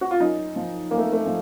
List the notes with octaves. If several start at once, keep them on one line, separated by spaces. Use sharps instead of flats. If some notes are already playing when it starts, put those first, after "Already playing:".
F#4
F4
F#2 D#4
F3
F#2 A#3
A3
A3
F3